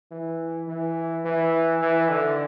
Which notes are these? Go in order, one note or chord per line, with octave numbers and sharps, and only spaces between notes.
E3
E3
E3
E3
D3